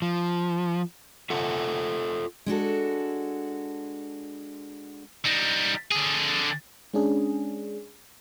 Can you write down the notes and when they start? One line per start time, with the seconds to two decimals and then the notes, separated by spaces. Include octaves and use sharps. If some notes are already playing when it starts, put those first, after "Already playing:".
0.02 F3
1.30 F4 A4 E5 F#5
2.46 G#3 D4 F#4 A4
5.25 G3 D#4
5.92 D3 G#4
6.94 G#3 C#4 D4 G#4